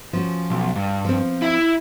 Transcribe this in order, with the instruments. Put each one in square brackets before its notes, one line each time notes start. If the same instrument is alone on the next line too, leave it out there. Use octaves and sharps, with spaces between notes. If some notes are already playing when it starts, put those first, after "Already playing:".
[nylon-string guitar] F3 C#4 F#4
[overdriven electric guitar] B1
G2
[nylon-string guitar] F3 C4
[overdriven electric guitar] E4 E5